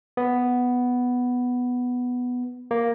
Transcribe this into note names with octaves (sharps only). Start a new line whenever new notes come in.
B3
A#3